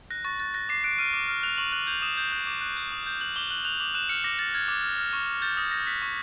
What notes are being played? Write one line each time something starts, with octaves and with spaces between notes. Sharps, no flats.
F#6 A#6
C#6 A6
F#6 A6
F#6 A#6
D6 C7
F#6 D7
F6 D#7
D6
F6
F#6 F7
C#6 F#7
F#6 F#7
G6 F7
D#6 E7
G6
F#6
D6
F#6
G6
D#6
G6
F#6 F#7
D6 G7
F#6 F#7
F#6 F7
D6 F#7
F#6 E7
F6 C#7
D6 A#6
F6 A6
F6 G#6
D6
F6
F6
C#6
F6
G6 A6
D#6 A#6
G6 A#6
F#6 B6
C#6